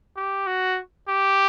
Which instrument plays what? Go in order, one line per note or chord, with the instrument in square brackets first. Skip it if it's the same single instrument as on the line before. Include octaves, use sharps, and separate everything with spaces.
[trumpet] G4
F#4
G4